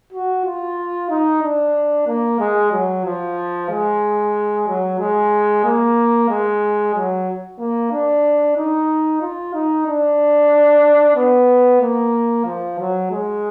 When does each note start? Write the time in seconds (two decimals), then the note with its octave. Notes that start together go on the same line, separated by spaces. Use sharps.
0.13 F#4
0.45 F4
1.10 D#4
1.43 D4
2.07 A#3
2.40 G#3
2.72 F#3
3.05 F3
3.70 G#3
4.68 F#3
4.99 G#3
5.64 A#3
6.30 G#3
6.95 F#3
7.59 A#3
7.92 D4
8.57 D#4
9.22 F4
9.54 D#4
9.87 D4
11.16 B3
11.81 A#3
12.46 F3
12.79 F#3
13.11 G#3